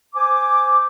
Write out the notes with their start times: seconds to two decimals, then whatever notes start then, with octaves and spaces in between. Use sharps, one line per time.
0.14 C5 G#5 D6